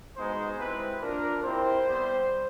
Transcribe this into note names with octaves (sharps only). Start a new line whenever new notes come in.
G#3 B3 D#4 F#4 C5
G#3 C4 E4 G4 B4
A#3 D4 F4 A#4
C4 E4 G4 C5
G3 B3